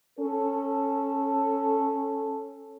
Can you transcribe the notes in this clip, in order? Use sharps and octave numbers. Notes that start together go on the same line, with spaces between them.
C#4 A4